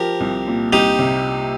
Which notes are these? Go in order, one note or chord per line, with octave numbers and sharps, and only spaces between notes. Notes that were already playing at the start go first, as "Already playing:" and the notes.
Already playing: F3 G4 A#4
C2
A#2
C2 D#4 G4
C3